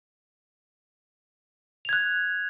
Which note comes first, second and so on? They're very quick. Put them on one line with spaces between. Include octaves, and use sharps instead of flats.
F7 G#6 F#6